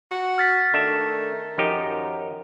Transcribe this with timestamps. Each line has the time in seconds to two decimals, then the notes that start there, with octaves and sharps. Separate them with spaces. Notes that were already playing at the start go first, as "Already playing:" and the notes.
0.11 F#4
0.38 F6 A6 B6
0.74 D#3 A3 D4 E5
1.58 F#2 F3 D#4 G4